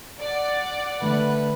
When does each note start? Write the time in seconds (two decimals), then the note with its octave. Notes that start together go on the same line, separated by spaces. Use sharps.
0.19 D5 F#5
1.02 D3 A3 D4 B4